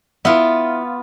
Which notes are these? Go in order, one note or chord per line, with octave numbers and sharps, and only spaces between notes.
B3 E4 F4 E5